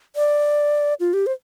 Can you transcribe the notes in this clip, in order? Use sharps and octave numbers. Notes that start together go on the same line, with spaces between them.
D5
F4
G4
C5